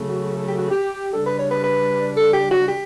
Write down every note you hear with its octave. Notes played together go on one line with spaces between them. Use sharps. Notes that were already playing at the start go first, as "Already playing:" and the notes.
Already playing: C#3 F#3 A3
F#4
A4
G4
F#4
G4
C#3 G3 D4 A4
B4
C#5
B4
B4
A4
G4
F#4
G4